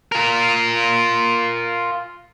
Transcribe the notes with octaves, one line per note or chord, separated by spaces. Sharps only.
F4 A#4